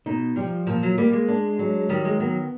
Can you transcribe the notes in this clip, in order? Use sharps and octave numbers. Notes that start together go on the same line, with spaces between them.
B2 D#4
F3 G3
A#2 F3
F#3
G3 A#3
G#3
D4
F#3
D#3 G3
G#3
F#3 B3